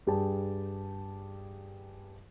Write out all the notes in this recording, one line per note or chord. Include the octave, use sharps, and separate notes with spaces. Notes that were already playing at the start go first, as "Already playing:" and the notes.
G2 G4 G#4 A5